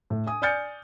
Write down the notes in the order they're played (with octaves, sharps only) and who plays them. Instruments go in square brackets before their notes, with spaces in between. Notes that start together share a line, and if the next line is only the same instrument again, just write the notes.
[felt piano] A2
G#5 D#6
D5 G#5 F6 G6 A6 C#7